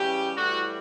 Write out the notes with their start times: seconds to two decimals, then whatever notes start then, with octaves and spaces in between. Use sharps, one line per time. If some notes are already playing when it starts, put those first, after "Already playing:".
Already playing: C#3 E3 G3 G4
0.36 A2 E3 G3 F#4